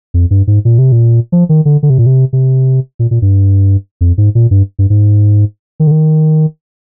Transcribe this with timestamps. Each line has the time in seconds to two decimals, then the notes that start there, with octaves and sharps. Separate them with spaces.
0.14 F2
0.31 G2
0.47 G#2
0.65 A#2
0.78 C3
0.92 A#2
1.32 F3
1.49 D#3
1.65 D3
1.83 D3
1.90 C3
1.98 A#2
2.06 C3
2.33 C3
2.99 A#2
3.11 A#2
3.22 G2
4.01 F2
4.18 G#2
4.35 A#2
4.51 G2
4.79 G2
4.90 G#2
5.80 D#3
5.87 D3
5.91 D#3